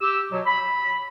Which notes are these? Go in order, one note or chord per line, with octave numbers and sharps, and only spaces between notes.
G4 E6
B2 F#3
B5